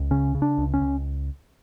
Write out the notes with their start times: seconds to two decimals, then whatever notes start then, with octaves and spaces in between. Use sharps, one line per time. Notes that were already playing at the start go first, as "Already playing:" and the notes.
Already playing: C#2
0.11 C#3 C#4
0.35 C#3
0.42 D4
0.58 C#2
0.74 C#4
0.81 C#2